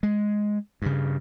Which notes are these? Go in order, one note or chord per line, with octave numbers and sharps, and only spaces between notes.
G#3
G2 C#3